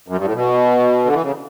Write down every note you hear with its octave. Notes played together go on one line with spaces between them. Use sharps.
F#2
G2
A2
B2
D3
E3
C#3